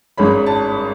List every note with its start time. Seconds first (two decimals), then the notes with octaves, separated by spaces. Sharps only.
0.18 G#1 G#2 G#3 C#4 B5
0.46 A5